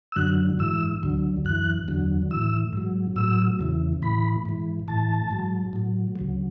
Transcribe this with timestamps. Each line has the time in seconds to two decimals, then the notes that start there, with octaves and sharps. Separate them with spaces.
0.12 E6
0.16 F#2 D3 F#3 F#6
0.59 G#2 E3 E6
1.03 D2 D3 F#3
1.45 F#2 E3 F#6
1.88 E2 D3 F#3
2.31 A2 E3 E6
2.73 G#2 F#3
3.16 A2 F#3 E6
3.59 E2 C#3 E3
4.02 A2 E3 B5
4.45 G#2 E3
4.88 A2 E3 A5
5.31 G#2 F#3
5.73 A2 F#3
6.16 D2 C#3 F#3